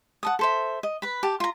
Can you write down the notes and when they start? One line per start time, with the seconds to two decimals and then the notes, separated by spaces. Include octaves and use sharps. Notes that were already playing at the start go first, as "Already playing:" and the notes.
0.23 F#5 A5 D#6
0.39 A4 C5 E5
0.83 D#5
1.02 B4 B5
1.23 G4 A5
1.40 F4 A#5